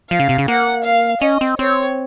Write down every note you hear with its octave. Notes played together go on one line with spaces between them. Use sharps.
F3 F5
C#3
C3
C#3
A#3 F#5
F5
C#4 D#5
C4
C4 C#5